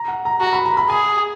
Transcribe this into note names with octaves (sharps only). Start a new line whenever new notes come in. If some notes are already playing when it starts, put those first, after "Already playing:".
Already playing: A#5
F#5
A#5
F#4 A#5
B5
A#5
B5
G#4 G#5